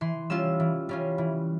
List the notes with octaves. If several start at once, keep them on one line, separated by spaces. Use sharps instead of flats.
E3 C6
G3 C#4 F4 E6
E3
G3 C#4 F4
E3